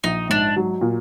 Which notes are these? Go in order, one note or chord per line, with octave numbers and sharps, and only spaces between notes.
A#1 D#4
G#2 D4
F#3
A#2